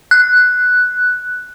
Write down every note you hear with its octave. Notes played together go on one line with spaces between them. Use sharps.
F#6